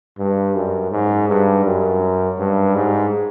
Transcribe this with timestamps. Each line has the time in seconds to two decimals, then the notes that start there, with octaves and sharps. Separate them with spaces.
0.19 G2
0.55 F#2
0.91 G#2
1.29 G2
1.65 F#2
2.38 G2
2.75 G#2